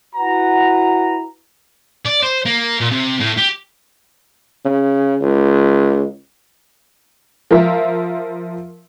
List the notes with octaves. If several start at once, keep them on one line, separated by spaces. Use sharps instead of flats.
E4 F#4 B4 F#5 A#5
D5
C5
A#3
A#2
C3
A2
G4
C#3
C#2
F3 F4 A#4 E5 F5